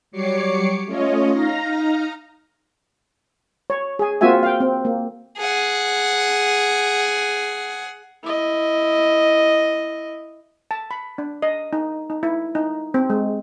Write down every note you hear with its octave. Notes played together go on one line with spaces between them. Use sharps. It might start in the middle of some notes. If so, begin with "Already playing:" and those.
F#3 G3 C#5 D6 C7 C#7
A3 C#4 F4 C#5 D#5
D#4 F5 A#5 F6 A#6
C#5
G#4 G#5
A#3 C4 F4 F#4 E5 G#5
F5 G5
C4
A#3
G#4 F#5
E4 D#5
A5
B5
D4
D#5
D#4
D#4
E4
D#4
C4
G#3